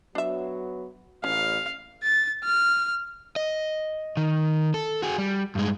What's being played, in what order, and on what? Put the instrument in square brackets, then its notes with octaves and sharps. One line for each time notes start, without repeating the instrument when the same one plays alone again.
[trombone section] F#3 B3 [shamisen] D4 E5
[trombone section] A1 [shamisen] C#4 [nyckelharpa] F5
[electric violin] A6
F6
[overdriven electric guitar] D#5
D#3
A4
F#4 G#4
G3
G2 G#3